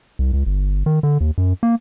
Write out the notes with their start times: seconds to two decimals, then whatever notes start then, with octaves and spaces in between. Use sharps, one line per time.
0.19 C2
0.33 C#2
0.46 G1
0.86 D#3
1.03 D3
1.21 D#2
1.38 F#2
1.63 A#3